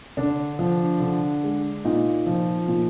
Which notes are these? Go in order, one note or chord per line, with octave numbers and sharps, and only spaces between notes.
D3 D4
F3
D3
G#3
A#2 D#4
F3
A#2